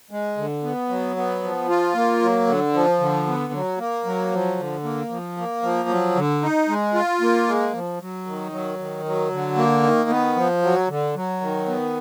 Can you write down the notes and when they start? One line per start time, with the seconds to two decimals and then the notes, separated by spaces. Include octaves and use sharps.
0.11 G#3
0.37 D3
0.63 B3
0.89 F#3
1.16 B3
1.43 F3
1.69 F4
1.94 A#3
2.22 F#3
2.47 D3
2.73 F3
3.00 D3
3.27 B3
3.53 F#3
3.78 A#3
4.05 F#3
4.32 F3
4.58 D3
4.84 A#3
5.10 F3
5.37 A#3
5.62 F3
5.89 F#3
6.16 D3
6.42 D#4
6.68 G#3
6.94 F4
7.21 A#3
7.47 G#3
7.74 F3
8.00 F#3
8.26 D#3
8.52 F#3
8.79 D#3
9.05 F#3
9.31 D3
9.57 A#3
9.83 D#3
10.10 B3
10.36 F3
10.62 F#3
10.88 D3
11.15 F#3
11.41 D#3
11.67 B3